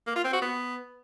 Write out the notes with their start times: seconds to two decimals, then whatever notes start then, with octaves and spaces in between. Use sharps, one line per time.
0.07 A#3
0.16 F4
0.24 C4
0.33 F#4
0.42 B3